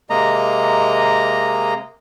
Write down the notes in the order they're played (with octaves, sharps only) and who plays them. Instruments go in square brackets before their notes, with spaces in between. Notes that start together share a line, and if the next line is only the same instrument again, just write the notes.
[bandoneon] C3 G#3 A#3 D#5 A#5